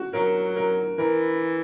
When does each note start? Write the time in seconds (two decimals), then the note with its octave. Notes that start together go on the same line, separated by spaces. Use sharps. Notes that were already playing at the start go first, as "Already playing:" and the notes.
Already playing: F#4
0.13 F#3 A#4
0.56 A#4
0.98 E3 A#4